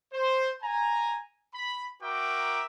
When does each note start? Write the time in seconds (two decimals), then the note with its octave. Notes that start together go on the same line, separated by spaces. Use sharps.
0.13 C5
0.63 G#5 A#5
1.54 B5
2.03 F#4 A#4 E5 G5 A#5 D6